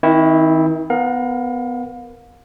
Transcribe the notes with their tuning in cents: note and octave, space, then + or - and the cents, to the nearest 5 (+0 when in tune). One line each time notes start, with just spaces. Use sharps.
D#3 +35 C4 +0 E4 +0
B3 +15 A#4 +0 F5 +40